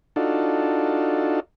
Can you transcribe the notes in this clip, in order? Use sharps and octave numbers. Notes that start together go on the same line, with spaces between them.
D4 D#4 F4 F#4 A4